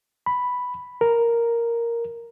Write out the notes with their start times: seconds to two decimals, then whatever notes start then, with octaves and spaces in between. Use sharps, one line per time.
0.26 B5
1.01 A#4